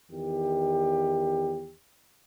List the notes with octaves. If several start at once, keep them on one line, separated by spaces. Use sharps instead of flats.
E2 D#3 G4